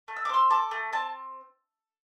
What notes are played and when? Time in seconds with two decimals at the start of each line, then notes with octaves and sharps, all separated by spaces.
0.08 A3
0.16 E6
0.25 D6
0.29 C4 C6 E6
0.50 A4 A5 D6
0.71 A3
0.92 C4 A5